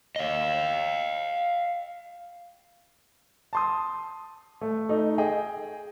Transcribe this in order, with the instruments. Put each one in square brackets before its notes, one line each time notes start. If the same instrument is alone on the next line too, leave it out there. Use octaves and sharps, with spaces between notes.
[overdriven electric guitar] D#5 F5
[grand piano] A5 C6 D#6
A3
A3 D#4
G#4 D#5 G5